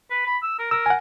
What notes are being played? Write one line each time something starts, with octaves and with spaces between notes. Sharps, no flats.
B4
B5
E6
A#4
A#4 E6
F#5 G#5